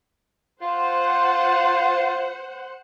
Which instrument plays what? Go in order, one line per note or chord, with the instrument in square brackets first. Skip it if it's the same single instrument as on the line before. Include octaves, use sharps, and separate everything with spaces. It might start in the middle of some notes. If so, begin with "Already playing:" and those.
[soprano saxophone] F4 [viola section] C5 F#5